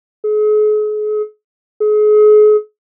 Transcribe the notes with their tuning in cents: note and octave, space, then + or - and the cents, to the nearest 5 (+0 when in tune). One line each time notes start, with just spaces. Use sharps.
G#4 +40
G#4 +35